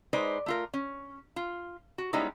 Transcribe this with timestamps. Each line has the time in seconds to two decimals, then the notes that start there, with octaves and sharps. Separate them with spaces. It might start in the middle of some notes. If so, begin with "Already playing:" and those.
0.13 G#3 D#4 B4 C5 D5
0.46 A3 F4 A#4
0.74 C#4
1.36 F4
1.98 F#4
2.13 G3 G#3 B3 C#4 D#4 E4